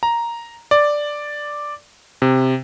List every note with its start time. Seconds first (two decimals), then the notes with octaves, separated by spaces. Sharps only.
0.03 A#5
0.71 D5
2.22 C3